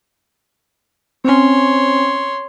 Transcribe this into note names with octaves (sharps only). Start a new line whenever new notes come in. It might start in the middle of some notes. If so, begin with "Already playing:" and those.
C4 C#4 C#5 C6